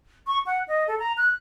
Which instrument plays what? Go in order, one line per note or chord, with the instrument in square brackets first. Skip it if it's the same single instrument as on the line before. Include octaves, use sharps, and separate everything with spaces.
[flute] C#6
F#5
D#5
A4
A#5
F#6